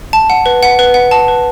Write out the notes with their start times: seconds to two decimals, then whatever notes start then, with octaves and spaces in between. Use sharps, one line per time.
0.13 A5
0.30 F#5
0.46 B4
0.63 F#5
0.79 B4
0.94 F#5
1.11 A5
1.28 B4